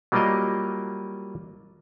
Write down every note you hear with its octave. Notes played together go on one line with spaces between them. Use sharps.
F#3 G3 A#3 F4 A#4 D#5